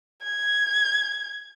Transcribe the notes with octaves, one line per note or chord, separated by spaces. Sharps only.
G#6